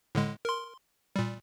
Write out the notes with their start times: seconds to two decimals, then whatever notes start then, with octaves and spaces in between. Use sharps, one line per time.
0.15 A2 D3 G#3
0.45 A#4 C6
1.16 A#2 G3